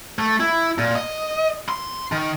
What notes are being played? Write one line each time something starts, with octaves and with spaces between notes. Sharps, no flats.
A3
E4
A#2
D#5
C6
D#3